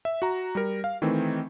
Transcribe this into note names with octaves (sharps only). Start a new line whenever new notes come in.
E5
F#4 A#5
G3 A#4
F5
D#3 E3 A3 C4